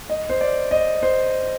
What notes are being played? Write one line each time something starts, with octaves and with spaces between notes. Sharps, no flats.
D#5
C5
D5
D#5
C5